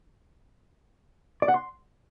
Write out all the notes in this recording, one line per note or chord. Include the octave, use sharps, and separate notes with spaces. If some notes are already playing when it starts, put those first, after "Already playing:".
D5
F#5
C6